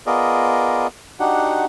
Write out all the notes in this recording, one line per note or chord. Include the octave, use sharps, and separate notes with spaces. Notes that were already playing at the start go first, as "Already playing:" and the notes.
B3 F4 G#4 A#4 D5 D#5
D4 D#4 F#4 G4 F#5